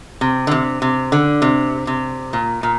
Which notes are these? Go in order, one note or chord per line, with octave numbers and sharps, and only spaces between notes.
C3
D3
C3
C3
D3
C3
C3
A#2
A#2